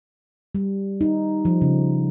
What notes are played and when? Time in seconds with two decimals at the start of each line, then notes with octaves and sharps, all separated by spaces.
0.55 G3
1.01 D#4
1.45 F3
1.62 C#3